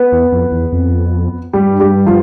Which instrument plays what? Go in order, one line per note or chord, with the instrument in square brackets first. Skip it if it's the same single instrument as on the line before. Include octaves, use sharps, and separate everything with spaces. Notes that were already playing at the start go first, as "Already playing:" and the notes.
Already playing: [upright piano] B3 B4
[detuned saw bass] E2
F2
E2
F2
[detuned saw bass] G2 [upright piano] G3 G4
[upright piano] G3 G4
F3 F4